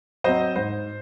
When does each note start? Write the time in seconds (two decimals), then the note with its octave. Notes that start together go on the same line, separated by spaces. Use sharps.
0.24 F#3 C4 C5 D#5
0.56 G#2 C5